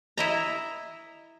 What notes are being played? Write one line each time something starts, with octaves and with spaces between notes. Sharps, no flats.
E4 D#5 A#5